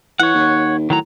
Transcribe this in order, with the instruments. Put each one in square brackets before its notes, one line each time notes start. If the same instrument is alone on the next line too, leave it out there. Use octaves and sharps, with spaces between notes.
[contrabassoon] E3 [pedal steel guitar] C#5 F#5
[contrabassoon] D#2
[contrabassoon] A2 [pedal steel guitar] D#3 F#3 A#5